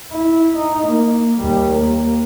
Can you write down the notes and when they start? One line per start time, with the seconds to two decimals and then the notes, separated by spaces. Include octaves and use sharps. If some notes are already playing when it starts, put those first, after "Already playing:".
0.12 E4
0.57 D#4
0.87 A#3
1.41 D#2 G3
1.73 A#3